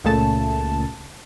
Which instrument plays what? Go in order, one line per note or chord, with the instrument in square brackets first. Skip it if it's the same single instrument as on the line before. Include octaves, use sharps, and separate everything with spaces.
[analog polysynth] C#2 A#2 C#3 A3 A5